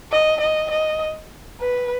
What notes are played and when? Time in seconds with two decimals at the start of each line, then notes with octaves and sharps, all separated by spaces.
0.12 D#5
0.41 D#5
0.71 D#5
1.60 B4